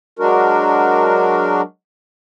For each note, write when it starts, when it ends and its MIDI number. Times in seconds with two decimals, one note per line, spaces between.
0.19 1.61 54
0.19 1.61 56
0.19 1.61 62
0.19 1.61 66
0.19 1.61 70